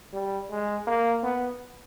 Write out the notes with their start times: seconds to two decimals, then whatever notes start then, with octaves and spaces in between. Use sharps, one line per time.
0.13 G3
0.50 G#3
0.87 A#3
1.23 B3